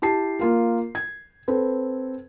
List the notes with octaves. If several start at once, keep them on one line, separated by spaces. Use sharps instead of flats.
E4 G4 A5 C7
A#3 F4 A#4
G#6
C4 A4 B4